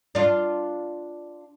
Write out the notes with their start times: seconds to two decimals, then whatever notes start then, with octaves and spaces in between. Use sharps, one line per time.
0.15 D4 F4